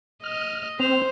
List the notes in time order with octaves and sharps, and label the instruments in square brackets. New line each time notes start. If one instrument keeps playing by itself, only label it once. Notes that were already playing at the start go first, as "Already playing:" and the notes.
[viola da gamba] D#5 [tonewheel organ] F6
[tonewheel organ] C4 [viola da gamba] C5 [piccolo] F7